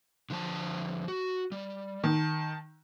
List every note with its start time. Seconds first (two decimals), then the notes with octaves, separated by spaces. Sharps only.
0.30 D3 F3 A5
1.08 F#4
1.52 G3
2.04 D#3 A5